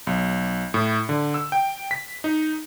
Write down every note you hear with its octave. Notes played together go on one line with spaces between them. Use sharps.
B1
A2
D3
E6
G5
B6
D#4